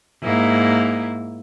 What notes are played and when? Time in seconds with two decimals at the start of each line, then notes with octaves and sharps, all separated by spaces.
0.22 G#2 A#3 E4